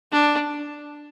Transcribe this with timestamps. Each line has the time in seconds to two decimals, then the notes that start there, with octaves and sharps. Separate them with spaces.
0.12 D4